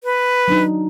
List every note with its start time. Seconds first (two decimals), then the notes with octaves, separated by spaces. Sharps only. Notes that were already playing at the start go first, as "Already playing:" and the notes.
0.04 B4
0.48 F#3 D4 D#4